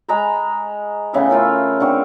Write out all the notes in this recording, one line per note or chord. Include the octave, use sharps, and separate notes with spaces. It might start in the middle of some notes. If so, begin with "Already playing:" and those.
G#3 A#5 B5
A2 C#3 B3 E4
A3 F4 A#4 B5
D3 C4 C#6